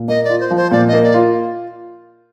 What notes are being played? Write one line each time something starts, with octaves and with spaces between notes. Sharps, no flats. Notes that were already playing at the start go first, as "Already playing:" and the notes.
Already playing: A#2
A#3 D#5
F4 D5
C5
F3
C5
A#2 D5
D#5
A#3
D5
F4